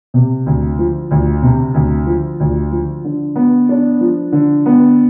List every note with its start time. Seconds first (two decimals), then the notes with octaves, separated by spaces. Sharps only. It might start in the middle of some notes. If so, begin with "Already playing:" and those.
0.14 C3
0.46 D2
0.79 F3
1.11 D2
1.43 C3
1.74 D2
2.07 F3
2.40 D2
2.72 F3
3.05 D3
3.36 B3
3.69 D4
4.01 F3
4.32 D3
4.66 B3